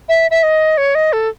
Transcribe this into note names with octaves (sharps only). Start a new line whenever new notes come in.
E5
E5
D#5
C#5
D#5
A4